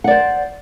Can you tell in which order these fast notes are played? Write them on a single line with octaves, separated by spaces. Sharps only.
F#5 D5 C5